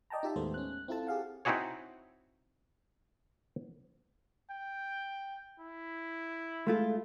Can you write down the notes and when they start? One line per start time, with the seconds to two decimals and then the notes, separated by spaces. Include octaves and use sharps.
0.10 D5 D#5 G5 A5 A#5
0.23 D#4 F4 G4 D#5 E5 A5
0.36 D#2 A2 G#3 A3 B3 C5
0.54 C#4 F#6
0.88 C4 E4 F4 A4 A5
1.07 G4 G#4 F5 F#5
1.45 C4 D#4 E4 F#4 G#4 C#5
4.50 G5
5.59 E4
6.67 G#3 A3 F4